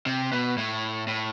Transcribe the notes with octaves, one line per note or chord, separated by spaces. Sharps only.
C3
B2
A2
A2